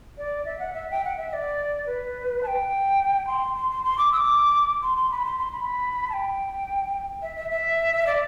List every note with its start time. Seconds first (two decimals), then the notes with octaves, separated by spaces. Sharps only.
0.18 D5
0.45 E5
0.59 F#5
0.74 E5
0.91 G5
1.05 F#5
1.17 E5
1.29 E5
1.33 D5
1.86 B4
2.43 A5
2.47 G5
3.27 C6
3.55 C6
3.70 C6
3.84 C6
3.98 D6
4.12 E6
4.17 D6
4.82 C6
4.96 C6
5.11 B5
5.25 C6
5.38 C6
5.52 B5
6.09 A5
6.13 G5
7.22 E5
7.36 E5
7.50 E5
8.06 D5